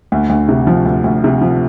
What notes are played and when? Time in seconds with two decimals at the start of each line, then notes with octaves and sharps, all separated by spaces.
0.12 D2
0.30 D2
0.49 C3
0.67 F3
0.86 D2
1.04 D2
1.24 C3
1.41 F3